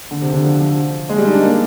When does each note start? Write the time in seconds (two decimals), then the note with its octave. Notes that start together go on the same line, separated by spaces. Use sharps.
0.11 D3
0.21 C3
0.32 D3
0.44 F3
0.60 F3
1.09 G#3
1.18 G3
1.26 D#4
1.34 D4
1.42 A#3